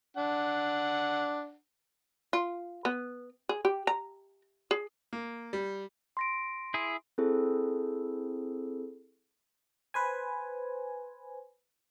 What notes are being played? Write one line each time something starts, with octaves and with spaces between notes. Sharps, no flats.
D4 F#5
F4
B3
G#4
G4
A#5
G#4
A#3
G3
C6 A#6 D7
E4 G#4
C4 E4 G#4 A4 C5
B4 C5 G#5